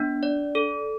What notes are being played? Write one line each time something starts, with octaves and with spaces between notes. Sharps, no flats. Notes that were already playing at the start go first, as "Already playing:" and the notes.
Already playing: B3 D4
D5
A4